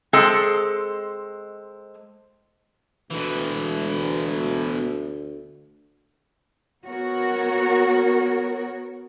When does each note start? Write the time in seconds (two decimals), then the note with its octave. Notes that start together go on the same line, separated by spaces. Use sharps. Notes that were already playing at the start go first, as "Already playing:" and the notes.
0.13 G#3 C4 A4
3.11 D2 B2 E3
6.87 B3 F#4 A#4 C#5